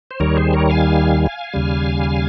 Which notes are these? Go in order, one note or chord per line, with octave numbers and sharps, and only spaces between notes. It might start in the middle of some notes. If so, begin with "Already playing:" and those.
C5
D#2 D#3 G3 A#4 C#5
G#4 C5
A#4 C#5
F5 G#5
D#2 C#3 G3